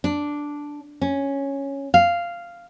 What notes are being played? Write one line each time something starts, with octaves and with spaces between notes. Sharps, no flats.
D4
C#4
F5